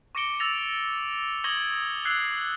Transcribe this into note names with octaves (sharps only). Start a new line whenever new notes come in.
C#6 D6 A#6 C#7 D7 G7
E6 A6 A#6 F7
C#6 D#6 G#6 A#6 F#7 G7
E6 F#6 G#6 C7